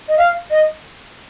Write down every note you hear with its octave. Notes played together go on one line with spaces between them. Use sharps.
D#5
F5
D#5